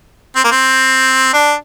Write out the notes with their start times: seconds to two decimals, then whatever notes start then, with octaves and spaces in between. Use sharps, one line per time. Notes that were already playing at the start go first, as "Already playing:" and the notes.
0.36 C4
0.44 A#3
0.52 C4
1.34 D4